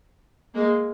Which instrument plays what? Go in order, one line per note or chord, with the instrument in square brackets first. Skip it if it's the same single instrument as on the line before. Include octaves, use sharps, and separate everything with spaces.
[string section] G#3 A#3